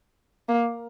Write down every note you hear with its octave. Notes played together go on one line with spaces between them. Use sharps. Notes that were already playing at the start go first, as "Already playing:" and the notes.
A#3